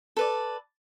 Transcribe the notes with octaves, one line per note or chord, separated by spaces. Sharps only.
A4 B4 D5